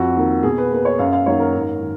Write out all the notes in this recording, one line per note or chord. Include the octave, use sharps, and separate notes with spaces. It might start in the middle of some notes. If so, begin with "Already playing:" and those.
Already playing: F2 F#4
D#3 A#3
B2 G#4
B4
A#3 B4
C#5
F#2 F5
F5
D#3 F#3 A#3 C#5
A#4
G#2
D#3